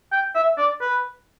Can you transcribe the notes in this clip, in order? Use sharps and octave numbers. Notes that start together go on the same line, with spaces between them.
G5
E5
D5
B4